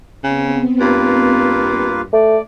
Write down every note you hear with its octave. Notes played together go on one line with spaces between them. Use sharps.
C#3 B3 C4
G2 A#3 F4 B4
A3 D5